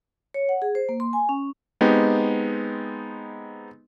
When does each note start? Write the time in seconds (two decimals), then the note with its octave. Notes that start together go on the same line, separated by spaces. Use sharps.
0.34 C#5
0.49 F#5
0.62 G#4
0.75 C5
0.89 A#3
1.00 C6
1.13 G#5
1.29 C#4
1.81 G#3 B3 C4 D#4 G4